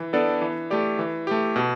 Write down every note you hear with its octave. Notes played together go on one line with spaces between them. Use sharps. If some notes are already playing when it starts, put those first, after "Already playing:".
Already playing: E3
B3 D4 A4 D5
E3
A3 G4 D5
E3
A3 G4
B2